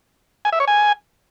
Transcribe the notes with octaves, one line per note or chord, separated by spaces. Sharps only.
G#5
E5
C#5
G#5